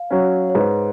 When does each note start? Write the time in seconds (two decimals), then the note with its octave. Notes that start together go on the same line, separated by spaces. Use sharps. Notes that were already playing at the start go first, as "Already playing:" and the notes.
Already playing: F5
0.10 F#3 C#4
0.50 C#5
0.55 G#2 B4